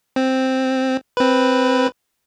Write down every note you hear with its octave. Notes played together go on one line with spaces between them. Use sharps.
C4
C4 B4